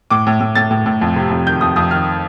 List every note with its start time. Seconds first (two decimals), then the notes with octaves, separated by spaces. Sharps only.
0.10 A2 D6
0.27 A2
0.40 A2
0.55 A2 A6
0.71 A2
0.86 A2
1.02 F2
1.16 C3
1.31 F2
1.47 D#3 G6
1.61 F2 D#6
1.76 F2 D#6
1.91 D#3 F6